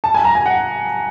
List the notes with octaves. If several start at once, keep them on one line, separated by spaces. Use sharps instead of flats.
A5
G#5
A#5
G#5
F#5